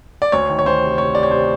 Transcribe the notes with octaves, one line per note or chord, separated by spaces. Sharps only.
D5
D2 C#5
D#3
C#5
D2 C5
C3
C3 C#5
C3 D5
C#5
C3 C5